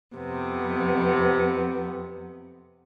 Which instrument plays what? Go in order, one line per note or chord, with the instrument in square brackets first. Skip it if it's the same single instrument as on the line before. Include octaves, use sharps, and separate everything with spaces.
[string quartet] F2 C3 B3